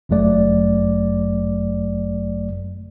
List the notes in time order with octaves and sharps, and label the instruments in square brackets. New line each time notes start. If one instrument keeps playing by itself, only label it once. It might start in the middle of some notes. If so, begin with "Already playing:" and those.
[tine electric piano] G1 F#2 F#3 A3 D5